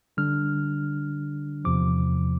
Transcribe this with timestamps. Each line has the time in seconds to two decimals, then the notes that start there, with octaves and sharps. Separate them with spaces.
0.17 D3 G3 D4 F6
1.65 E2 C3 F3 D6